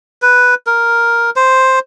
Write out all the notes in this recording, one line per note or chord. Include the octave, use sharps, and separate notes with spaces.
B4
A#4
C5